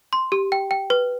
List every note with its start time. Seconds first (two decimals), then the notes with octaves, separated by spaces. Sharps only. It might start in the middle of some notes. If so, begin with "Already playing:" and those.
0.13 C6
0.32 G4
0.52 G5
0.71 G5
0.90 B4